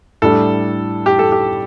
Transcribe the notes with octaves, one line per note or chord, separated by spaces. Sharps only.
A2 G3 D4 A4
G4
A4
G4